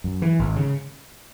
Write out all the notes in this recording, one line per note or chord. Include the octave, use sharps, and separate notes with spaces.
F#2
E3
G#1
C#3